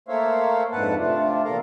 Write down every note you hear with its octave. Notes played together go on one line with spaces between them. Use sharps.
A3 A#3 C5 C#5 E5 F5
F2 G#2 D3 B4 F#5 A5
C3 A3 D4 F4
E2 A#2 A4 A#4 F5 A#5